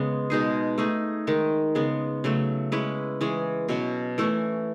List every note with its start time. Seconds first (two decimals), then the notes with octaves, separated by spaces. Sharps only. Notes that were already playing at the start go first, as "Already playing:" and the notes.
Already playing: C#3 G#3 B3
0.30 B2 G#3 D#4 G#4
0.78 A3 D#4 G#4
1.27 D#3 G#3 D#4
1.75 C#3 G#3 B3
2.24 C#3 F#3 A3
2.72 G#3 C#4 E4 B4
3.21 E3 G#3 C#4 G#4
3.69 B2 F#3 C#4 F#4
4.18 E3 A3 C#4